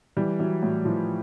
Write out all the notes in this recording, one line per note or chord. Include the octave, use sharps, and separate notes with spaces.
E3 G3
E3 F#3
A2 F#3
E3 F3